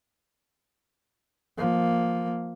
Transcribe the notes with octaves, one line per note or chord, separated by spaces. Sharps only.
F3 A#3